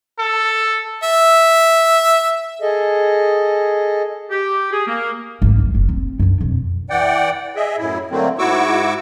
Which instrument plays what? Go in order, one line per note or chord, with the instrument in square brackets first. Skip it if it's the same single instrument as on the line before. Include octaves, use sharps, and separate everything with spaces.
[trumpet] A4
[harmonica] E5
[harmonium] G#4 A4 D#5
[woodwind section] G4
G#4
A#3
[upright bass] G#1 C4
D1 D#2
F#1
C4
F#2 D4
F2 B2
[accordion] E3 D5 F#5 G5
G#4 D#5 E5
F#2 A2 E4
D3 F#3 A3 A#3 C4
G#2 E4 F#4 C#6 D6 E6